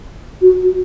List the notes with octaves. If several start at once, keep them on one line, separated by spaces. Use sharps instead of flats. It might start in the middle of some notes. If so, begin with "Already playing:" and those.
F#4